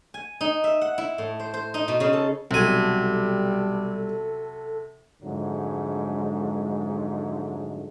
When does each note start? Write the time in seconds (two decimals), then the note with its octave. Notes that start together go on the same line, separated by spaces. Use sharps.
0.14 G#5
0.41 D#4
0.64 E5
0.81 F#5
0.98 E4
1.18 A2
1.40 C5
1.54 C5
1.74 D#4
1.88 B2
2.00 C#3
2.13 A4
2.51 B1 C3 F#3 G3 A4 G#5
5.23 F2 G#2 D3 F#3 G#3 A3